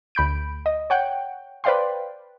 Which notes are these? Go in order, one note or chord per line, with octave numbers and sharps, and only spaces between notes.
D2 B5 G6 D7
D#5
C#5 F#5 G5
B4 C5 D5 F5 G5 C6